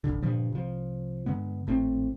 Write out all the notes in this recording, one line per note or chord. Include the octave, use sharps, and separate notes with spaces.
D#1 A1 D#2 D3
G2 A#2 D3 F3
C2 F3
G2 D3 G#3 B3
G#1 A2 A3 C4